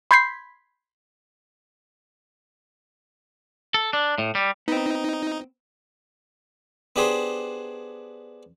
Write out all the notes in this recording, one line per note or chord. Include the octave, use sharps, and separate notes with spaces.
B5 C6 G6 G#6 B6 C7
A4
D4
A2
G3
B3 C4 D#4
B3 D4 G4 G#4 C5